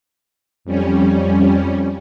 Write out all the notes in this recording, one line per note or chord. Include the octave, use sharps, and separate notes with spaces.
F2 G3 C#4